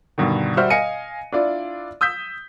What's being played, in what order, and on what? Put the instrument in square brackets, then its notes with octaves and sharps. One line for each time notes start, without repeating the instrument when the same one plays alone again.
[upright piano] G2 B2 D3 D#3
G3 F#4 C5 E5 F6
D#5 F5 G#5 C#7 D#7
D4 E4 F4 D5
D#6 E6 G6 B6